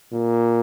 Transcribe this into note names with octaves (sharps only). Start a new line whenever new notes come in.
A#2